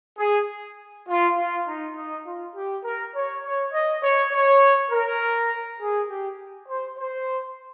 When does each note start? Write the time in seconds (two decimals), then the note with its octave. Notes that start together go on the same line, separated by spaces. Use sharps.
0.18 G#4
1.07 F4
1.37 F4
1.66 D#4
1.96 D#4
2.26 F4
2.55 G4
2.84 A#4
3.14 C#5
3.44 C#5
3.72 D#5
4.03 C#5
4.32 C#5
4.91 A#4
5.79 G#4
6.09 G4
6.68 C5
6.98 C5